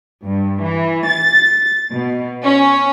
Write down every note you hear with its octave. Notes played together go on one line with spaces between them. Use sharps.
G2
E3
A6
B2
C#4